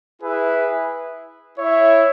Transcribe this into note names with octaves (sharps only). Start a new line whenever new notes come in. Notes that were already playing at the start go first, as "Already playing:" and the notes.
E4 G#4 B4 E5
E4 C#5 E5